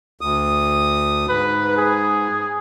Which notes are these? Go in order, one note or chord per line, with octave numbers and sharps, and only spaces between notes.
D2 D#6
G#2 B4
G#4